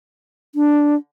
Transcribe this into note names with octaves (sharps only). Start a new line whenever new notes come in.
D4